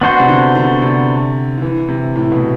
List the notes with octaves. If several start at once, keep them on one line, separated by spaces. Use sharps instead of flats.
B3 D4 F#4 C5
C3
D3
D3
C3
D3
E3
C3
A2
B2